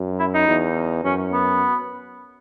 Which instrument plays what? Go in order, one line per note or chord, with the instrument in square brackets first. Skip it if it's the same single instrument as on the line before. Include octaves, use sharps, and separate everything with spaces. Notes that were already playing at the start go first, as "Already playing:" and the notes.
Already playing: [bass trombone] F#2
[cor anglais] E4
D#4
[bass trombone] E2
[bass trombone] F#2 [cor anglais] C#4
[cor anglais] B3